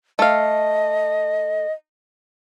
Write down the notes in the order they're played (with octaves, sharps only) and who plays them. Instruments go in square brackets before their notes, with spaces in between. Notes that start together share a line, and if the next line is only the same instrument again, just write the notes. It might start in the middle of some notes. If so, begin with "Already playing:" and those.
[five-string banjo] A3 F5 [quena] D#5